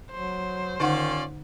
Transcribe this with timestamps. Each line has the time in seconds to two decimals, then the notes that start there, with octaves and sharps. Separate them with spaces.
0.11 F#3 C5
0.80 D3 D#3 C#4 D#4 F4 D5 F#5